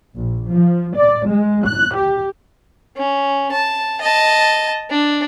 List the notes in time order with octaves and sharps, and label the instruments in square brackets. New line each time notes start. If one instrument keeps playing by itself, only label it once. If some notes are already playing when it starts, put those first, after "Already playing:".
[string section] A#1
F3
D5
G#3
F#6
G4
[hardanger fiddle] C#4
A5
D#5 A5
D4